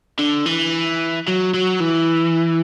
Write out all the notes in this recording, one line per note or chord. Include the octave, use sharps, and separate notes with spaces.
D3
E3
F#3
F#3
E3